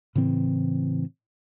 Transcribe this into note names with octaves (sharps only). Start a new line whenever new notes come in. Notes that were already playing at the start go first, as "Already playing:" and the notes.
A2 C#3 E3 C4